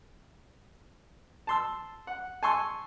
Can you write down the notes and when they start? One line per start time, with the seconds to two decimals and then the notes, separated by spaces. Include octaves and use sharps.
1.47 A5 C6 E6
2.07 F#5
2.43 G#5 A5 C6 C#6 E6